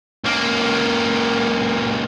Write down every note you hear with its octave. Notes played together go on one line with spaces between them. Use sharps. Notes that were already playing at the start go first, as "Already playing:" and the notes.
C#2 A#3